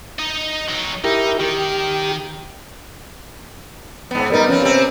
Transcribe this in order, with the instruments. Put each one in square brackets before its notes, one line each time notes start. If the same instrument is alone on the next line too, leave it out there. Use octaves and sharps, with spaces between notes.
[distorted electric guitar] D#4 D#5
F#3 D#4
[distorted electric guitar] D#4 [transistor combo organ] E4 G4 A#4
[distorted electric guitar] D#3 [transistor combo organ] G4
[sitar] G#2 B3
[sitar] G3 D#4 [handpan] B3 A#4 B4
[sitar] F3 C4 [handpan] C#4
[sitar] C3 C4